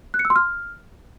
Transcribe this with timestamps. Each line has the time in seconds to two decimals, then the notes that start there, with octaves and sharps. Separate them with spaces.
0.14 F#6
0.19 C#7
0.25 E6
0.30 C6
0.36 F6